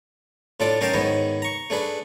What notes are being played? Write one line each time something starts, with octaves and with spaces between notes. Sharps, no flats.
A2 D4 F4 A4 D6
C#4 D#4 A#4 F5 G5 A5
G#2 D#3 B3 E4 C#5 D#5
A#5 C#6
A3 D4 G#4 B4